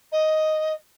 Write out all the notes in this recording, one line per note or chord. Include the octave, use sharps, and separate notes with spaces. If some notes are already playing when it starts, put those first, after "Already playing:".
D#5